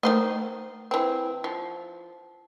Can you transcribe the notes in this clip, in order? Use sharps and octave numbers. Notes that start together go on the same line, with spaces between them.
D#3 A3 C5 D#5
E3 C4
F3